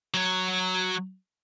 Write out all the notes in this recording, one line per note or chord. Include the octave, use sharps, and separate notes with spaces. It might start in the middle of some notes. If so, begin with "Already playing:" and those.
F#3 C#5